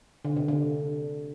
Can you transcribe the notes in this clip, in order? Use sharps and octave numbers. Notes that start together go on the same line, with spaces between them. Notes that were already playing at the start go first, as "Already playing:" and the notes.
D3
C3
D3